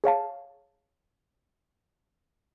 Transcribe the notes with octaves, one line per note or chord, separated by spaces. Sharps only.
G#4 C#5 F5 A5